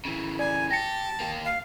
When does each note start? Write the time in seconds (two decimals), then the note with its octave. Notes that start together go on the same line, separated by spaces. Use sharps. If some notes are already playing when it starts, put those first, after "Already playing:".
0.05 C#3 E3
0.39 D5 G#5
0.71 G4 A5 A#6 C#7
1.20 A#3 G4
1.45 F5